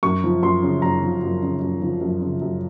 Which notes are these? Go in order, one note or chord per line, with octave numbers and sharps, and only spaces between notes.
F#2 C#6
F3
F#2 C6
C#3
F#2 A#5
F3
F#2
C#3
F#2
F3
F#2
C#3
F#2